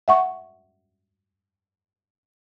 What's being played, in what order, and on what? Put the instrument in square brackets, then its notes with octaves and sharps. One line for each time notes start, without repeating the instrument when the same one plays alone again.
[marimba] E5 F#5 C#6